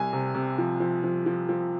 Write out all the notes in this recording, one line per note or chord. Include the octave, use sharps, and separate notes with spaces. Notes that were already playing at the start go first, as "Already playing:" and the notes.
Already playing: C2 G#5
C3
C3
F3
F3
F3
F3
F3